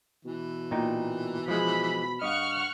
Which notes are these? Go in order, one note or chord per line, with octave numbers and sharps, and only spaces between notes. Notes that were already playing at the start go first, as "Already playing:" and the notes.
B2 E3
A#2 D#4 G5
F3 G#3 B5
G2 D#5 F5 F#5 C#6 F6